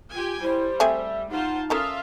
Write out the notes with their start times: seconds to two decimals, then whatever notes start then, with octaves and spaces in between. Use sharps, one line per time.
0.13 F4 G4 G5 G#5
0.42 G3 E4 C5
0.80 A3 C4 G#4 E5
1.31 D#4 F4 C5 F#5 A5
1.70 C#4 F4 A4 A#4 E5 F5 D#6